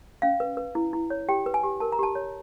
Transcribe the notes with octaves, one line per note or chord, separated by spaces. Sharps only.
C#4 F5
B4
B4
E4
E4
C#5
G4 G5
B4
G#5
G4
A#4 A5
A#5
G4 A5
C#5